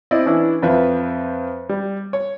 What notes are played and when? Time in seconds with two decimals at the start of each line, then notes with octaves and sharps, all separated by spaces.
0.11 C4 E4 D5 D#5
0.26 E3 C#4 D4 E4
0.62 F2 F3 B4 E5
1.69 G3
2.13 C#5